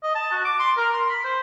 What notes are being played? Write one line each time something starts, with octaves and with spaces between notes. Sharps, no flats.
D#5
A5
F#4
D6
C6
A#4
C6
B5
C5